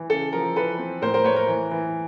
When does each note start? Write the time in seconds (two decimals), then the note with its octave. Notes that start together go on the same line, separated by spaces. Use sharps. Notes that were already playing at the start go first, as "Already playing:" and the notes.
Already playing: E3
0.10 C#3 A4
0.33 F3 A#4
0.56 E3 A4 B4
0.78 C4
1.02 A2 A#4 C5
1.14 A#4 C5
1.24 A3 B4 C#5
1.36 A#4
1.48 E3
1.71 E3